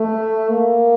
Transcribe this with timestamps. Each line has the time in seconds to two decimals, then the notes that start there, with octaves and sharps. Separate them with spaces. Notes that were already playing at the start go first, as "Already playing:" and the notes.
Already playing: A3
0.49 A#3